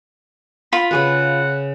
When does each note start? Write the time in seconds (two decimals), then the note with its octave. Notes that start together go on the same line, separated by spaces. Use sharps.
0.73 F4 B5
0.91 C#3 G#4 B4 F#5